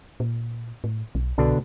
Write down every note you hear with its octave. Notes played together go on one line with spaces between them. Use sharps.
A#2
A2
B1
C2 B2 D3 D4